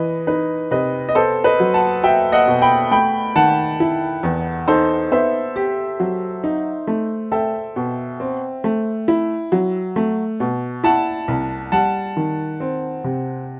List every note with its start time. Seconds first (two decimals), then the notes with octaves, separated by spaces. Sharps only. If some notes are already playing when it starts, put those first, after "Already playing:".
Already playing: E3 B4 D#5
0.27 D#4 B4
0.71 C3 B4 D#5
1.09 D#5
1.15 B3 A4 C5
1.44 B4 D#5
1.60 F#3
1.74 F#5 A5
2.03 F#4 E5 G5
2.32 D#5 F#5
2.47 B2
2.62 G5 B5
2.91 A3 G5 B5
3.36 D#3 F#5 A5
3.80 E4
4.23 E2
4.68 D#4 A4 C5
5.12 B3 C5 E5
5.56 G4
6.00 F#3
6.44 D#4
6.87 A3
7.32 A4 E5 G5
7.76 B2
8.20 C4
8.64 A3
9.08 E4
9.52 F#3
9.96 A3
10.40 B2
10.84 E4 F#5 A5
11.28 C2
11.72 G3 F#5 A5
12.17 D#3
12.60 C4
13.04 C3